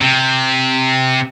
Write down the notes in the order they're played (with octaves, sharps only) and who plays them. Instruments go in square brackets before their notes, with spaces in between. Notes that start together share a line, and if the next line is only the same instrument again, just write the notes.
[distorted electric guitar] C3